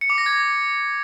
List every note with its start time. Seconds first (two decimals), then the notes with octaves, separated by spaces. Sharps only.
0.01 C#7
0.10 D6
0.18 A#6
0.26 G#6